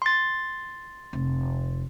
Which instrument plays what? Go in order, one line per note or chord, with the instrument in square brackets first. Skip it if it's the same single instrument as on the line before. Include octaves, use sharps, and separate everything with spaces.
[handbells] C6 A6
[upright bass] F1